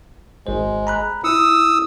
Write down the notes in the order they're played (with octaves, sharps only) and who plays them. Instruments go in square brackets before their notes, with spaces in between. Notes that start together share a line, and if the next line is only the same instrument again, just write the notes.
[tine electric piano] G#1 C5 [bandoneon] G#3
[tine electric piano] A#5 B5 F#6
[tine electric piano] E4 [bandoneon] D#6 E6